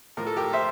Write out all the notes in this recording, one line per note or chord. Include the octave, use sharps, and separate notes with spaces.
A2 F3 A#4
A4
G4 A#4
C5 E5